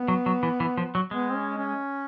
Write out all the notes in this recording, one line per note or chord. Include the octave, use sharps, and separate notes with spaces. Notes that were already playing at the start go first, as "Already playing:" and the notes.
Already playing: B3
F#3
F#3
E3
E3
F3
F#3
G#3 B3
C4
C#4
C#4